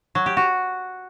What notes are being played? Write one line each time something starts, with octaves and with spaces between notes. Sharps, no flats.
F#3
G4
F#4